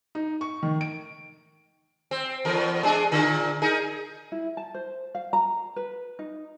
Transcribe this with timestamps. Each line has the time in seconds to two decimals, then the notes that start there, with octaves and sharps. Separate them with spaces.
0.15 D#4
0.41 C#6
0.63 D#3
0.81 D7
2.11 C4
2.45 E2 A#4
2.83 G#3 D4 G#4
3.11 A#2 D3
3.62 D#4 G#4 A#4
4.32 E4
4.57 A5
4.74 C5
5.15 F5
5.33 A#5
5.76 B4
6.19 D#4